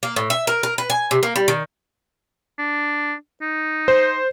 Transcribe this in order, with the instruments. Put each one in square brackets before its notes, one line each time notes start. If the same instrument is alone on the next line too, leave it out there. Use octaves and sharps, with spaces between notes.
[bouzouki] A#3
A2
E5
A#4
A#4
B4
G#5
C3
A#3
G3
D#3
[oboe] D4
D#4
[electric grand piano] C5